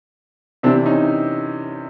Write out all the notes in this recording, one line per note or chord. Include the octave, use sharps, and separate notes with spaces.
C3 E3 C4 D4
C#4 D#4